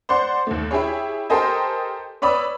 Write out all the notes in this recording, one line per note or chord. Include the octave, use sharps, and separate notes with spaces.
C5 D5 F#5 C6
D#2 A3
E4 G4 G#4 C#5
G4 A4 A#4 C5 D#5 G#5
B4 C#5 D5 B5 D#6 E6